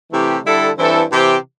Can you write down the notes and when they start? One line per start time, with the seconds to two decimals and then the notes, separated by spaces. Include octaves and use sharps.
0.12 C3 E3 A3 E4 G4
0.44 D3 G3 E4 A4
0.78 G2 E3 C4 E4 A4
1.10 C3 E3 C4 G4